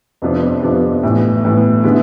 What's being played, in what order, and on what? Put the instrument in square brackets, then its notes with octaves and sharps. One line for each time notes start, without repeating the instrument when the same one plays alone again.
[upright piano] F2 C3 F3 B3 D4
F2 C3 F3 B3 D4
A2 E3 B3
A2 E3 B3
D3 G#3 B3 E4